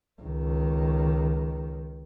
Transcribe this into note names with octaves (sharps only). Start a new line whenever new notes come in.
C#2 D#3